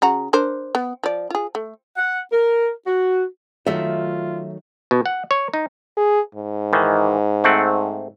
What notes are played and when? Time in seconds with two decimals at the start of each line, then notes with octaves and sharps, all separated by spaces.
0.02 C#3 F#4 A#5
0.33 D4 A#4 C5
0.75 B3
1.04 F3 D5
1.30 F4 G#4
1.55 A3
1.97 F#5
2.31 A#4
2.86 F#4
3.66 D#3 F#3 A3 F4 E5
4.91 B2
5.06 F#5
5.31 C#5
5.54 D#4
5.97 G#4
6.35 G#2
6.73 D#3 E3
7.44 A3 C4 F#5